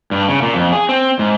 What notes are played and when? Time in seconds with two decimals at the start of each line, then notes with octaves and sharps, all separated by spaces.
0.11 G2
0.29 C#3
0.42 A#2
0.54 F2
0.72 G#4
0.89 C4
1.19 G#2